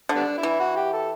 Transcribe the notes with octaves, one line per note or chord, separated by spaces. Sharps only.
D3
G3 B3 D4
E4
E3
F#4
G4
A4